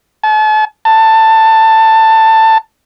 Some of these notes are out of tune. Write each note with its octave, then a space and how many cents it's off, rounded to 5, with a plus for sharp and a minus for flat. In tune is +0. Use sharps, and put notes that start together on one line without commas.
A5 -40
A5 +15